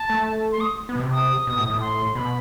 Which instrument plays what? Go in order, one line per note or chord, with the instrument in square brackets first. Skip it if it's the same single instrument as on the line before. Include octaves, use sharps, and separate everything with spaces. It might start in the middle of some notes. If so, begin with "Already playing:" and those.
Already playing: [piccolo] A5
[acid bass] A3
[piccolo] C6
D#6
[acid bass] B3
B2
C3
[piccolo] D#6
[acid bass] B2
A2
A2
[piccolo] C6
[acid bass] B2 [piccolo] B5